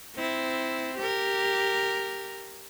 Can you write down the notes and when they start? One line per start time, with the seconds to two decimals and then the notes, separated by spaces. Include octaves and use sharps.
0.16 C4 E4
0.98 G4 A#4